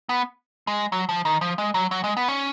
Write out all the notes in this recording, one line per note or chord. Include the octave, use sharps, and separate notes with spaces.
B3
G#3
F#3
F3
D#3
F3
G#3
F#3
F#3
G#3
B3
C#4